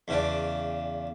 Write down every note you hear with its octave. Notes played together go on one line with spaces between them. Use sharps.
E2 C#3 D4